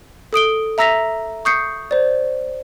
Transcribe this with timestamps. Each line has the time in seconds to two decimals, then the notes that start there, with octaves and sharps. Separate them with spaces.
0.33 A4 D#6 D7 G7
0.78 E5 A#5 E6 A#6 B6 F7
1.45 C#6 D#6 G6 C7 C#7
1.91 C5 D5